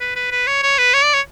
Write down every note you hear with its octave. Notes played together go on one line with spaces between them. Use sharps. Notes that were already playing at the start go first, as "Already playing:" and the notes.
B4
B4
B4
C#5
C#5
B4
C#5
D5
C#5